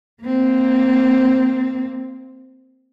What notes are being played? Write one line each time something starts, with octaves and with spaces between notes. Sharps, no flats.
A#3 C4